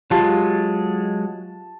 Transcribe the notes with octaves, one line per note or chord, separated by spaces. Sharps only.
F#3 G#3 F4 G4 A5